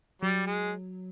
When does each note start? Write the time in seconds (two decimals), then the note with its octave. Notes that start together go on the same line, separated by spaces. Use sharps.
0.22 F#3 G3
0.46 G#3